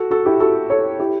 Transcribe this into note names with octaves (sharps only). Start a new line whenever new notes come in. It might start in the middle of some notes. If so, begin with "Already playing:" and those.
Already playing: F#4 A4
F#4 A4
E4 G4
F#4 A4
A4 C#5
E4 G4